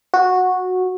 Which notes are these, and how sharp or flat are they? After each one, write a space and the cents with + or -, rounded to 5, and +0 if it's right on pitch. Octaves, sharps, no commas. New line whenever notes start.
F#4 -10